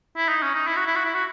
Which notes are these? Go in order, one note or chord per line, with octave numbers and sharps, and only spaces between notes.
E4
D#4
C#4
D#4
E4
F#4
E4
F#4
E4
F#4